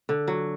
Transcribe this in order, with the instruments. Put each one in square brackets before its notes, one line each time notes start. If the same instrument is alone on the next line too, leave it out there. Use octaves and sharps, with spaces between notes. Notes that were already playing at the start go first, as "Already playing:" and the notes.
[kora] D3
F#3